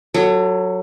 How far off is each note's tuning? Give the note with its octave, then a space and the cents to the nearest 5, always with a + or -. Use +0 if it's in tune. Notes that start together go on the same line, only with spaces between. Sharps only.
F#3 +0 A4 +25